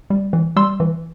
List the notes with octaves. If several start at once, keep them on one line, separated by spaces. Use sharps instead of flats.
G3
E3
G3 C6 E6
E3